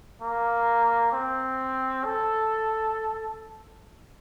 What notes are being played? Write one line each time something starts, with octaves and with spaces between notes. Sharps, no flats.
A#3
C4
A4